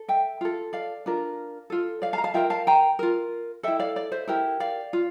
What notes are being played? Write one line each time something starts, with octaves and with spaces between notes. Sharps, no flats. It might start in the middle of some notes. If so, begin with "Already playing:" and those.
Already playing: A4
E5 G5
F4 A4
D5 F5
D4 F4 A#4
F4 A4
D5 F5
F5 A5
A#5
F5 A5
F4 A#4 E5 G5
F5 A5
G5 A#5
F4 A#4
E4 A4 E5 G5
D5 F5
D5
C5 E5
E4 G4 A#4
D5 F5
F4